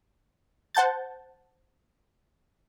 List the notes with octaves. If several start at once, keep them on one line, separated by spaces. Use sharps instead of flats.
C5 F#5 A5 G6 A6